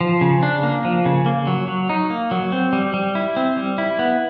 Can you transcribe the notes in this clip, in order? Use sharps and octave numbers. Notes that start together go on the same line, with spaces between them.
F3
C#3
D4
A#3
F3
C#3
A#3
F#3
F#3
D#4
A#3
F#3
C4
G3
G3
E4
C4
G3
E4
B3